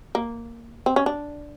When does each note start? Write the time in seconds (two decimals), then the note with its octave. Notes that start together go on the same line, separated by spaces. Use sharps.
0.15 A#3
0.86 C4
0.96 C#4
1.06 D4